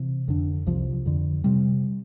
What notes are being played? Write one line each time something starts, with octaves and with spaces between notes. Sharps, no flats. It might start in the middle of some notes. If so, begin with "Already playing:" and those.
Already playing: C3 E3
F2 D3
C2 C3 F3
F2 D3
C3 G3